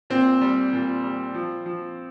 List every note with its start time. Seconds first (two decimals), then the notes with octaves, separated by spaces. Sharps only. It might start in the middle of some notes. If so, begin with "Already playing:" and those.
0.10 A#2 C4
0.41 G3
0.73 A#2
1.04 G3
1.34 F3
1.66 F3